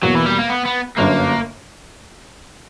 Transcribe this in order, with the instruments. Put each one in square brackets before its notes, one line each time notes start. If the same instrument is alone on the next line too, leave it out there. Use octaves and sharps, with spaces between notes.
[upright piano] E2 B2 A#3 [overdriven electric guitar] F#3
[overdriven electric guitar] E3
G3
A#3
B3
B3
[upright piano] G1 F#2 D3 [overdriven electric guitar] A#3